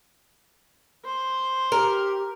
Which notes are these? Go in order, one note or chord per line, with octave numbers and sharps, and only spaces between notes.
C5
G4 A#4